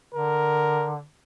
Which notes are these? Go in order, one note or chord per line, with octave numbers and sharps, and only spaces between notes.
D3 A#4